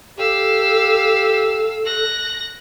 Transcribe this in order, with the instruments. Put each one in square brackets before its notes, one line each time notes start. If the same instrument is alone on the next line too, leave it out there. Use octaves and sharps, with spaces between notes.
[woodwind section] G4 [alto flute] A4 [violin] F5 E6
[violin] F#6 A#6